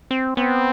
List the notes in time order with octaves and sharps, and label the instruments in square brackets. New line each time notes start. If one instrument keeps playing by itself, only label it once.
[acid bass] C4
[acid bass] B3 [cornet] C4